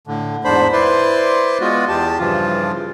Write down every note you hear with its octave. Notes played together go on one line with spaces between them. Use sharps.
A2 D3
E2 G#2 D4 C5 B5
E4 B4 C5 D5 C6
G#3 B3 F4 F#4
E2 G4 A5
G2 C#3 E3 F3 F4